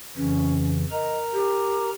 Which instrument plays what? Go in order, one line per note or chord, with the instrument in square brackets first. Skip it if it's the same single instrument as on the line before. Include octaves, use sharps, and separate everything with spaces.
[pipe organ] F2 C#3 E3 [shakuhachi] C#4
[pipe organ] A#4 A#5 [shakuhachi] D#5
[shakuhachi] G4